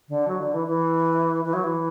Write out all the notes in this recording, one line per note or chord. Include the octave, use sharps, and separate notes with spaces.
D3
F#3
D3
E3
E3
E3
F#3
E3